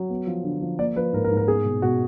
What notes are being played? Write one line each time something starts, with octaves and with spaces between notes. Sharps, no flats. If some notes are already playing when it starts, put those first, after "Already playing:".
Already playing: F#3
B3
F3
D3
F3
A#3 D5
F3 B4
G#2 A#4
A#4
G#2
A#4
B3 G#4
B2
B2 F#4